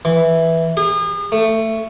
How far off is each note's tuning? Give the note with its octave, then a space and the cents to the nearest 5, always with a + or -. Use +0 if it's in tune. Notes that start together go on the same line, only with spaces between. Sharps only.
E3 -5
G#4 -40
A3 +15